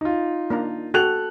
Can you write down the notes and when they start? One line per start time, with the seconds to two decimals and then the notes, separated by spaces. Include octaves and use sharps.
0.01 D#4 F4
0.50 A#3 D4 A#5
0.94 F#4 A4 G5 F#6 F7